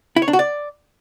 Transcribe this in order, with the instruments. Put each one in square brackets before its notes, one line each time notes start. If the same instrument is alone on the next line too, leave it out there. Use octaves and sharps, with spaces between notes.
[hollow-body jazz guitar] E4
C#5
D4
F#4
D5